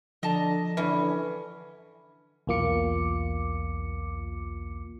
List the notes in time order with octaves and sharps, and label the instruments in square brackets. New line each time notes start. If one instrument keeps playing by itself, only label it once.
[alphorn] D3 [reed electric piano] F3 [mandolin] D#5 A5 A#5
[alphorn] D3 [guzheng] E3 [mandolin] C#4
[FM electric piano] B1 E2 A#3 F4 D6 C#7